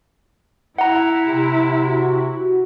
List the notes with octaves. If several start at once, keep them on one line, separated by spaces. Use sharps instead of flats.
E4 F#5 A#5
C3
F#4